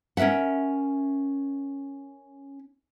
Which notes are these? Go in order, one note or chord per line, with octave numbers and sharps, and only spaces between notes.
C#4 A#4 B4 E5 F#5